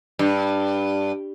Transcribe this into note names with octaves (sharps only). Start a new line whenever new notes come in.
G2